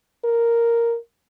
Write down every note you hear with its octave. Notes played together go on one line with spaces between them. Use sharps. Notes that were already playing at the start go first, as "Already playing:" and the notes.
A#4